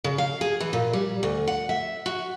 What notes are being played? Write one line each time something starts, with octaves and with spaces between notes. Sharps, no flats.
C#3
F5
G#4
E3
A#2
G3
D2
F#5
E5
F#4